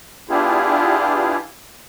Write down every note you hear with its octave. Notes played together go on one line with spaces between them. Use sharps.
B3 D4 E4 F4 G4 G#4